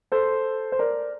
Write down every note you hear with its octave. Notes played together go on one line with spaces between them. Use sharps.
A4 C5
C5
A#4 D5